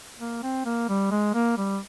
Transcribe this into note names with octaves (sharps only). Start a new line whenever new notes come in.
A#3
C4
A#3
G3
G#3
A#3
G3